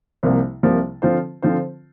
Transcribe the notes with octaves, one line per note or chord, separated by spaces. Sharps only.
C2 C3 F3 A#3
C2 C3 F3 A#3
D3 F3 C4 F4 C5
D3 F3 C4 F4 C5